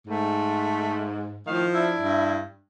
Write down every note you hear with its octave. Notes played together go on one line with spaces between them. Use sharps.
G#2 A3
A2 D#3 F3 F5
D4 E4
G2